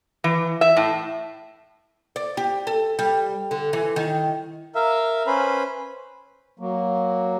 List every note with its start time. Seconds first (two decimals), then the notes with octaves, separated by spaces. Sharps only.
0.24 E3
0.61 E5
0.77 A2
2.16 D5
2.37 G4
2.67 A4
2.99 G3
3.51 D3
3.73 E3
3.96 D#3
4.75 A#4 E5 F5
5.27 C#4 B4 C5 B5
6.59 F#3 A#3